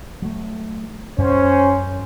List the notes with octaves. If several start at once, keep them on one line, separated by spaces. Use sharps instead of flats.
F#3 A3
F#2 C#4 C5